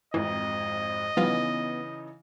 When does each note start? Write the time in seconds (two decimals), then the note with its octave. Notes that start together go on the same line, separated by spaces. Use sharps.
0.14 G#1 F2 G#2 E3 D#5
1.17 C#3 E3 F3 G3 B3 D#4 F4